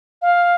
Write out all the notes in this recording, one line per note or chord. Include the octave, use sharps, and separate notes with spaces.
F5